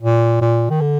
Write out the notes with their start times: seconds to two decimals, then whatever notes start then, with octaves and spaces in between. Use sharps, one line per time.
0.02 A#2
0.41 A#2
0.70 D#3
0.81 D3